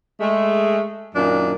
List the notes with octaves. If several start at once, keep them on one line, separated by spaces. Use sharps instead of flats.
G#3 A3
F#2 A#2 D#3 D4